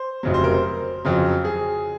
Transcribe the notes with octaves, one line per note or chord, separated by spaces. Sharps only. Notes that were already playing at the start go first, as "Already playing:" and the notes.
Already playing: C5
F1 F2 C#3 F#3
C5
A#4
C5
F2 C#3 F#3
G#4